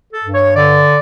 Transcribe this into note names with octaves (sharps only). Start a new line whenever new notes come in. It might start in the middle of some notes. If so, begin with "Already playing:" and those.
A4
G2
C#5
D3 D5